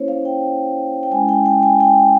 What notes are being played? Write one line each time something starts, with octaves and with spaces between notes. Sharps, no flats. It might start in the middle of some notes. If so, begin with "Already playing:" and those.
Already playing: A#3 C#4 E4 C5 C#5
F5
G5
G5
G#3 C#4 E4 G#5
G5
G5
G#5
G5